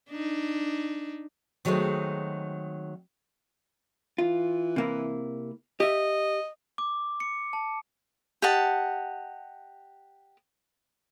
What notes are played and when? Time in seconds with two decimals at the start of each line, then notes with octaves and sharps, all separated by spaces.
0.10 D4 D#4
1.65 D#3 F#3 G#3 A3 C4
4.18 E3 F4
4.76 C3 A#3 E4
5.80 G4 D#5 E5
6.78 D6
7.20 C#7
7.53 A5
8.42 G4 D#5 F#5 A5